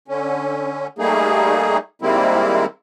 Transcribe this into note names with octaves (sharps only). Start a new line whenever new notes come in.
D3 C#4
G3 A3 A#3 D#4 G#4
D#3 G3 G#3 A#3 C4 E4